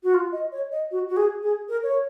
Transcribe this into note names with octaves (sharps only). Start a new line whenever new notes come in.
F#4
F4
D#5
C#5
D#5
F#4
F#4
G#4
G#4
A#4
C#5